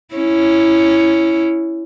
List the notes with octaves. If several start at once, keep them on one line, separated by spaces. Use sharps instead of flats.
C#4 E4